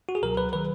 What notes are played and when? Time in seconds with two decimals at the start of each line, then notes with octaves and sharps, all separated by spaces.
0.09 F#4
0.15 G#4
0.22 C#2 B2 F#3 A#4
0.37 B4
0.53 D#3 F#3 B4